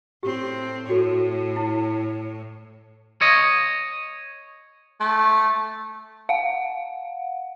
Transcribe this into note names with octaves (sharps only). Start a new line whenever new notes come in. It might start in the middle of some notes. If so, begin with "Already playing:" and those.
A2 C4 G4
A2 F#4 A4 C#5
E4
C#5 D#5
A3
F5 F#5